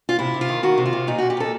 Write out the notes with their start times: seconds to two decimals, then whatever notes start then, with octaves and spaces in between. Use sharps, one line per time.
0.09 F4
0.19 C3 E4
0.34 C3
0.41 F4
0.48 D#3
0.63 D#3 F#4
0.78 C3
0.86 F4
0.93 C3
1.07 A#2 D#4
1.18 A#2 F#4
1.30 G4
1.37 A#2 A4